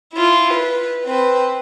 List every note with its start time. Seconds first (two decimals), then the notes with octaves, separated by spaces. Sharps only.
0.13 E4 F4
0.53 B4
1.05 C4 B4